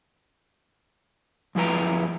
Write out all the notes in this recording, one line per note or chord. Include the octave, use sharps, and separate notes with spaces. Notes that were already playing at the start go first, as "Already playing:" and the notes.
F#2 F3 E4 B4 A#5